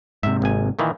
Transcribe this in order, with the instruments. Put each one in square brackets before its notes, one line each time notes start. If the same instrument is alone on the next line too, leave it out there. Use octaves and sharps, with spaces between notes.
[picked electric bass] G#2 C3 [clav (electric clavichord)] E5
[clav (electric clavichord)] G#1 G#5
A#2 D#3 E3